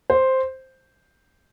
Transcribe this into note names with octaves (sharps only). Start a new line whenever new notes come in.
C5